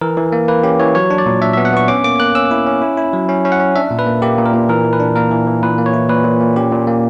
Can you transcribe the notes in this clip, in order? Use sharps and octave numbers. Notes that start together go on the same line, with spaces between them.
E3 A#4
E3
A#3
A#3 B4
C#4 G4
E3 C#5
F#3 C#5
D4
D5
A#2
D4 E5
B3 E5
F#5
B3 C#6
C#4 D6
A#3 D6
A#3 F#6
C#4 E6
E4
C#4
E4
E4
F#3
C#4
C#4
F#5
C#4
D4 E5
A#2
B4
A#3
A#3 G4
A#2
A#4
A#2
E3 A#4
E3
B4
D4
A#3 A#4
E3
E3
A#2 B4
A#3
C#5
E4
A#2 B4
A#2
A#2
C#4 G4
A#2
A#3